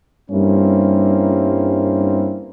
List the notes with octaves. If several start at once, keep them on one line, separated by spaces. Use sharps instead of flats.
G2 G3 A#3 C4 C#4 E4